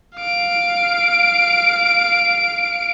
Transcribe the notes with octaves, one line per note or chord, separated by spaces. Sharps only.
F5 D7